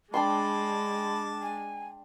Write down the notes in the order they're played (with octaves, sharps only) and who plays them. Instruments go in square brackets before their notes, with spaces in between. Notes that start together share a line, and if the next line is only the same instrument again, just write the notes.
[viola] G#3 [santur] D4 G5 C6 [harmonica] A5 D6 [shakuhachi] B5
[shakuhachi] G#5